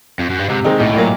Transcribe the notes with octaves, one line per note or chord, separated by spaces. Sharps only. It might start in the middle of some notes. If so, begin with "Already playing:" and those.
F2
F#2
G2
G#2 C3
D#3 G#3 C4 D#4
B1 A2
A#2 F#3 A#3